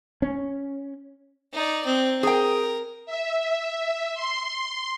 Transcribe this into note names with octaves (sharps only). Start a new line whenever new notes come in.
C#4
D#4 D5
C4
G#4 A#4 G5
E5
C6